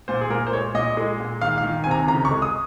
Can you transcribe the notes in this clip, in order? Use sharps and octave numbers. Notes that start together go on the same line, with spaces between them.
A#2 C5
G#4
A#2 A#4
C5
G#3 C#5
A#2 D#5
G#3
A#2
D#3 F5
F5
D#3
C3 G#5
A#5
C#3 A#5
C#6
G#3
D#6